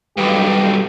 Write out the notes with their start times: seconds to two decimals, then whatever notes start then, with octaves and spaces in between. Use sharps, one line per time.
0.17 B1 G2 G4